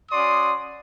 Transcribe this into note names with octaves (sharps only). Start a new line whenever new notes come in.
C#4 F#4 D5 C6 D#6